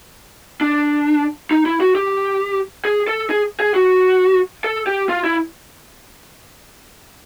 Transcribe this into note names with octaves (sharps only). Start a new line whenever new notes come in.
D4
D#4
E4
F#4
G4
G#4
A4
G#4
G#4
F#4
A4
G4
F4
E4